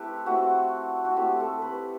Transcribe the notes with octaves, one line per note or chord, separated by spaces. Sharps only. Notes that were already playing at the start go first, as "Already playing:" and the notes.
Already playing: A3 C4 E4 G4 A4 B4
A3 C4 E4 F#4
F#4
A3 C4 E4 G4
A4
B4